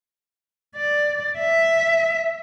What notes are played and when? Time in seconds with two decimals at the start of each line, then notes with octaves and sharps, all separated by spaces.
0.76 D5
1.39 E5